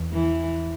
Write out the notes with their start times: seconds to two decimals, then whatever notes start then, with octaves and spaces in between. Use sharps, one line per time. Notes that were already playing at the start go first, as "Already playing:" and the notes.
Already playing: E2
0.12 E3